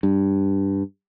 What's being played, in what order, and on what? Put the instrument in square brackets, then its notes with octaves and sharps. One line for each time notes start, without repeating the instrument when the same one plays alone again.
[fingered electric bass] G2